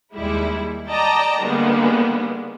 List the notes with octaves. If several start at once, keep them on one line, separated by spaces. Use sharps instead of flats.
D#2 G3 G#3 E4
D5 D#5 G5 A5 A#5
D3 D#3 G3 G#3 A#3 B3